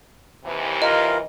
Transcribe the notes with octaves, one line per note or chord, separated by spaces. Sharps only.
D#2 C3 E3
F4 A#4 D#5